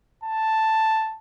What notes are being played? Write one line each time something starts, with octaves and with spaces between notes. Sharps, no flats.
A5